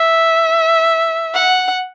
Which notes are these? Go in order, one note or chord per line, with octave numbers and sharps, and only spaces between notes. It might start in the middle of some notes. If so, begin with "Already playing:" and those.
Already playing: E5
F#5